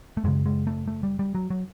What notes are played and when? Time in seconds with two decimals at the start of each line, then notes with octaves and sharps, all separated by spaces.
0.17 A3
0.24 F#2 C#3 G#3
0.46 G#3
0.67 A3
0.88 A3
1.03 G3
1.19 G3
1.35 F#3
1.50 F#3